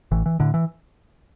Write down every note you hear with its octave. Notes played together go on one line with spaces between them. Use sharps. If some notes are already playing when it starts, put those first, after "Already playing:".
A1 E3
E3
A2 D3
E3